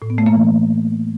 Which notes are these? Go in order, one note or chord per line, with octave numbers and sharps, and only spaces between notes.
A2
B3
A3
A#3
E3